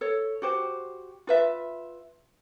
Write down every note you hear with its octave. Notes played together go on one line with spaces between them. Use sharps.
A4 C#5
F#4 G4 C5
F4 B4 E5